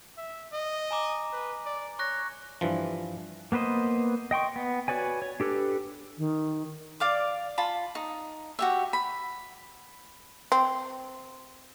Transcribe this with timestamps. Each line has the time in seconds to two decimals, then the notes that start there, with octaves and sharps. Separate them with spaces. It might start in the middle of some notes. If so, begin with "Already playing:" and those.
0.17 E5
0.53 D#5
0.91 G#5 A#5 D6
1.33 B4
1.65 D5
1.99 C#5 C#6 F#6 A#6
2.61 G2 E3 F3
3.52 A#3 B3 B4 C5 D#5
4.31 D#5 G5 C6 C#6
4.56 B3
4.88 F#4 B4 C#5 D5 G#5
5.22 C#5
5.40 D4 G4 A4 B4
6.18 D#3
7.00 D5 F5 D6
7.58 F4 A5 B5
7.95 D#4
8.59 F#4 G4 E5
8.93 B5
10.52 C4